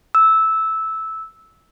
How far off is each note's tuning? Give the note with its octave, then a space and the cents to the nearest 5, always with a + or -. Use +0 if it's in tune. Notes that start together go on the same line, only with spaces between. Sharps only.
E6 -10